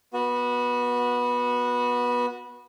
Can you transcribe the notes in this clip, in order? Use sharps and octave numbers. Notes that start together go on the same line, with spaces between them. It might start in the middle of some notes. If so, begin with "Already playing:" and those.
B3 F#4